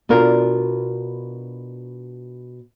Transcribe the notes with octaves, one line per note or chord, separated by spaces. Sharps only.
B2 D4 F4 A#4